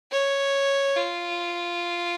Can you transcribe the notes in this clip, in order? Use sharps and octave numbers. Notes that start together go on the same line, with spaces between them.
C#5
F4